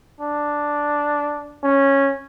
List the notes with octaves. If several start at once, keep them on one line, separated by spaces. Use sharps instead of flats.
D4
C#4